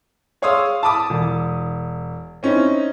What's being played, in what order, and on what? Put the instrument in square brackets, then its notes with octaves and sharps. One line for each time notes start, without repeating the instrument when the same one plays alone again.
[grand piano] G#4 C#5 F5 C6 D#6 E6
A5 B5 D6 D#6
E1
C4 C#4 D#4 E4